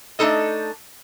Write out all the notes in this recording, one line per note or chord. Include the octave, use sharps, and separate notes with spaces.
A3 D4 D#4 A4 D#5